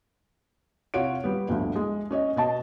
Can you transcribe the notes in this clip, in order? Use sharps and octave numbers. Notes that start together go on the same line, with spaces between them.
C3 F4 C#5 F#5 D7
G3 B3
G1 D2 F3
G#3
C#4 C#5 D#5
B2 D#5 A5